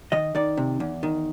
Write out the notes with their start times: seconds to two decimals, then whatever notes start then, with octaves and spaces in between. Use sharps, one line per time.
0.12 D#3 D#5
0.35 D#3 D5
0.57 C3
0.80 E2
1.03 D#3